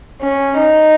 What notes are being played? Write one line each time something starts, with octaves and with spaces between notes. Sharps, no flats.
C#4
D#4